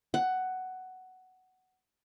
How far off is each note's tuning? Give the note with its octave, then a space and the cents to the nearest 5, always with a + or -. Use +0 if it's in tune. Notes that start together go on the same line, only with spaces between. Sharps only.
F#5 +10